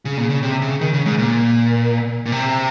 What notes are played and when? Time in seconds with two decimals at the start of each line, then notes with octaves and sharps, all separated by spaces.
0.05 C#3
0.17 A#2
0.30 C#3
0.43 C3
0.61 C#3
0.81 D#3
0.93 C#3
1.06 G#2
1.18 A#2
2.26 A#2
2.32 C3